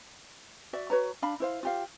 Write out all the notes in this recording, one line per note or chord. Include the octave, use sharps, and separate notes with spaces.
F#4 D5 E5
F#4 B4 C#5 A#5
D4 F5 B5
E4 C5 F5
F4 G4 F5